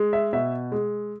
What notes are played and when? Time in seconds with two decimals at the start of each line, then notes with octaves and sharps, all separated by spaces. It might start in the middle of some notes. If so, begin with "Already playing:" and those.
Already playing: G#3
0.13 E5
0.33 B2 E5
0.72 G#3